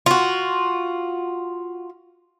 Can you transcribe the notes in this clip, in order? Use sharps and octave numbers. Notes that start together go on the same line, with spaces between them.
F4 F#4